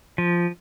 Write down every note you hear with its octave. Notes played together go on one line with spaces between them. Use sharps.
F3